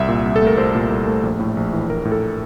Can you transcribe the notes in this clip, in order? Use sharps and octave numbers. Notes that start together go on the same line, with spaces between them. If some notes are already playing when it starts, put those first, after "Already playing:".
Already playing: C2 E5
A#2
C2
A4
A3 A#4
C2 C5
A#2
C2
A3
A#1
A2
A#1
E3
A#1 A#4
A2
A4